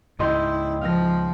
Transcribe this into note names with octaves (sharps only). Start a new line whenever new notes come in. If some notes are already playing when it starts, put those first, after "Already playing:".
C#2 G#2 E4 D#5 G5 C6
F3 F5 A#6